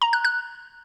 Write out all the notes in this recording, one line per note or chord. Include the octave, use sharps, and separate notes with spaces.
A#5
F#6
F#6